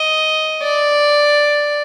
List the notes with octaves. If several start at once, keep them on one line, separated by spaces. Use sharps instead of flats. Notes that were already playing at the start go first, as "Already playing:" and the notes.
Already playing: D#5
D5